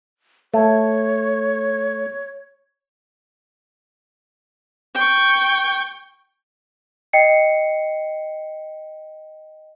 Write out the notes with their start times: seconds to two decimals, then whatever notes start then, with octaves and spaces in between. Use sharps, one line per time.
0.54 A3 C#5
4.95 G5 C#6
7.13 D#5 G5 C7 C#7